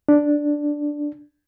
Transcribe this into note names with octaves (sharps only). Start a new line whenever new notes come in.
D4